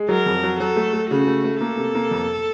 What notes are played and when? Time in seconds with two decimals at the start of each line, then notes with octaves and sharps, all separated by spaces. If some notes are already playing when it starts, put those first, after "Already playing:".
Already playing: G#3
0.08 F#3 A#4
0.26 F2
0.43 F#3
0.60 F#3 A4
0.76 A3
0.93 A3
1.10 C#3 F#4
1.27 A3
1.44 A3
1.61 A#3 A4
1.77 C3
1.95 A#3
2.11 F2